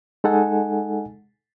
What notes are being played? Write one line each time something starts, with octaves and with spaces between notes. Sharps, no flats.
G#3 D#4 A4 F#5 G#5